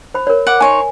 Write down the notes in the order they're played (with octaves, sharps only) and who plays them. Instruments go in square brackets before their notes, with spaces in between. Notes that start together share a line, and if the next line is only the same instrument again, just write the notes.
[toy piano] C5 B5
A#4 C#5
[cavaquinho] F#5 D6
[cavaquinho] D#4 C#5 C6 [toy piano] G#5